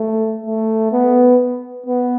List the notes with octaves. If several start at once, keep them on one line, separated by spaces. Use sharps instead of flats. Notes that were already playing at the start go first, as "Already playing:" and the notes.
Already playing: A3
A3
B3
B3